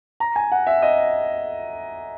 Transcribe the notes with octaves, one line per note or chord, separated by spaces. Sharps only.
A#5
G#5
F#5
E5
D#5